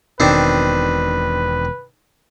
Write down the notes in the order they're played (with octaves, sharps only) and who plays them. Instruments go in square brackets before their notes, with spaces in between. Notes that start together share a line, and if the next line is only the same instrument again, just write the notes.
[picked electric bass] E1 B2 [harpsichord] D#3 C4 D4 [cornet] B4